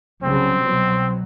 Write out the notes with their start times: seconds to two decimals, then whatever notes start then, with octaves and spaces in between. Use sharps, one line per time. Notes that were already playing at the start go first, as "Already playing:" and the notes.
0.23 C2 C#3 F#3 C4
0.63 B2 F#3